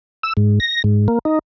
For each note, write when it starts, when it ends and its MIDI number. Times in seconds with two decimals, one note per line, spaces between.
0.23 0.33 88
0.37 0.59 44
0.60 0.82 94
0.84 1.08 44
1.08 1.19 58
1.25 1.39 63